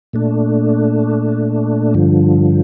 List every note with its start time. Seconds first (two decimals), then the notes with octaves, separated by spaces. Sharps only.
0.13 A#2 A3 D4
1.94 G2 D3 F3